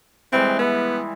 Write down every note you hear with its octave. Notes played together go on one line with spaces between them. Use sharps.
E3 G3 G#3 C4
B3 E4